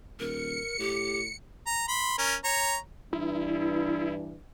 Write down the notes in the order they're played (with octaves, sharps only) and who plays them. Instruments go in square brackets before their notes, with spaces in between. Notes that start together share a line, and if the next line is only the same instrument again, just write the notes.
[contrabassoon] D#1 [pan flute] A#4 [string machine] C#7
[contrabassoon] A2 [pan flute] G4
[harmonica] A#5
B5 C6
C#4 A#4
C#5 A#5
[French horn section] G2 E3 D4 [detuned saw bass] E4